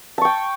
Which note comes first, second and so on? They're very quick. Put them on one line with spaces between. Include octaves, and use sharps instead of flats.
A5 C#6 G5